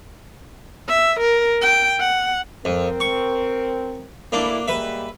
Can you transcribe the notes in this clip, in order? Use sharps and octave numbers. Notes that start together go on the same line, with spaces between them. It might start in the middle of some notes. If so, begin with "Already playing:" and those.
E5
A#4
G5
F#5
F2 C4 A#4
C#6
D2 A#3 D4 E4
G3 G#3 A#3 B4 E5